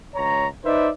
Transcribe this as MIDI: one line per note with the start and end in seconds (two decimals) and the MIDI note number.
0.16 0.47 37
0.16 0.47 73
0.16 0.47 82
0.65 0.90 63
0.65 0.90 71
0.65 0.90 72
0.65 0.90 74
0.65 0.90 76